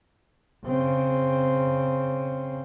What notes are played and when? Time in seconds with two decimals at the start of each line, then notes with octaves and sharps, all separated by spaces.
0.66 C#3 C4